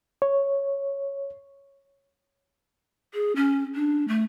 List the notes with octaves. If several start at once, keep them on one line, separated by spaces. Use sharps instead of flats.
C#5
G#4
C#4
D4
A3